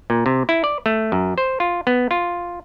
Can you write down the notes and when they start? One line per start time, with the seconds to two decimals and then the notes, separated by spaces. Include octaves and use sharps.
0.10 A#2
0.26 C3
0.49 E4
0.64 D5
0.86 A3
1.12 F#2
1.38 C5
1.60 F4
1.87 B3
2.11 F4